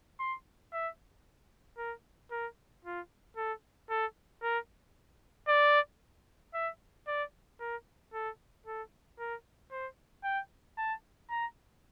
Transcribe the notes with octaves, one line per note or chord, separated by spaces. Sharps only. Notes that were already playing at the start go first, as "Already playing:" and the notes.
C6
E5
A#4
A#4
F4
A4
A4
A#4
D5
E5
D5
A#4
A4
A4
A#4
C5
G5
A5
A#5